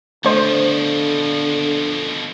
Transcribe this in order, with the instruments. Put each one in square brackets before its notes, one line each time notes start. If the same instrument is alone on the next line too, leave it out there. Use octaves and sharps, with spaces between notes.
[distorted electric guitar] B2 F3 [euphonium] D3 [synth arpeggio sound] A3 C5